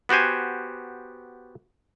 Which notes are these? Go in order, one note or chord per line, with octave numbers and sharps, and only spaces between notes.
B3 F#4 G4 C5 G#5